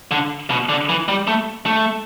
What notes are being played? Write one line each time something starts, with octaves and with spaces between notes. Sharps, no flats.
D3
B2
D3
E3
G3
A3
A3